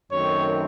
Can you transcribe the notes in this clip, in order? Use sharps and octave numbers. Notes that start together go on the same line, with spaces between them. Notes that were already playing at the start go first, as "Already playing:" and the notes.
F#2 D#3 A3 C4 C#5